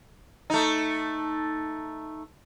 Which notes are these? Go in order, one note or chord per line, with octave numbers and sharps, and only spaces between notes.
A3 D#4